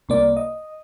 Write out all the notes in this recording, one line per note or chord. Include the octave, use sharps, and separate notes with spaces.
C2 A#3 D5
D#5